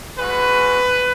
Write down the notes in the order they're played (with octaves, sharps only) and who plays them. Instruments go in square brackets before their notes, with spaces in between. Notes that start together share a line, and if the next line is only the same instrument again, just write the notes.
[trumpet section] G#3 C#4 F#4 B4